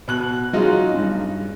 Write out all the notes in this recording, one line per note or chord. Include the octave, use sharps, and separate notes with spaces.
B2 F#6 F#7
F#3 G#3 D#4 F4
G2